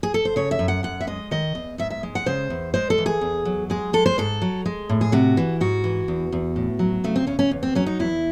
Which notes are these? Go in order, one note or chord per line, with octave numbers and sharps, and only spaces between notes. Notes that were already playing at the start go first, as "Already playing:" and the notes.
G#4
A4
C5
C#3 C#5
E5
F#2
F#5
F#2 F#5
E5
G#3 D#5
D#3 D#5
E2
G#2 E5
E5
G#3
F#5
C#3 C5
E2
G#3 C5
A4
E3
G#4
E2
F#3
G#3 G#4
G#3 A4
C5
G#2 A4
F#3
G#3
A2
G#4
C3 F#4
E3
G#2 F#4
E3
E2
E2
A2
F#3
C#3 A3
C4
E2 C#4
C#4
E2
C4
F#3 C#4
D#4
E2 E4